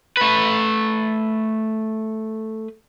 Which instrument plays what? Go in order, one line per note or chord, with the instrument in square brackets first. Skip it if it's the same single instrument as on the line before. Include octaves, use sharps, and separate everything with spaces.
[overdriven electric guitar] A3 B4